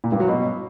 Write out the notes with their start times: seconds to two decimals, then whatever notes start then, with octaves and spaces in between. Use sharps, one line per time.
0.04 A#2
0.12 G2
0.20 F#3
0.28 B2